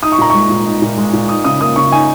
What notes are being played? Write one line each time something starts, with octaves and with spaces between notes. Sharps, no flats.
D#4 D#6
C#6
A#2 A#5
G#3 C#6
A#2
D#4
A#2
G#3
A#2
D#4 D#6
C#3 D#6
A#3 D#6
C#3 C#6
D#4 G#5